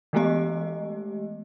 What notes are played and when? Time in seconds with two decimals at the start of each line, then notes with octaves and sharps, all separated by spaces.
0.13 E3 G#3 A3 B3 G4 D#5